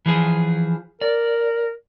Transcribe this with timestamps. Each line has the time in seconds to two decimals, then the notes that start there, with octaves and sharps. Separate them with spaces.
0.06 E3 F3 G#4
1.01 A#4 D5